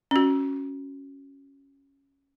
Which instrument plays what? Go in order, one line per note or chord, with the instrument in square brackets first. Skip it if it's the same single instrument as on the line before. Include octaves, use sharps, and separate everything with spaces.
[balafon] C#4 F#4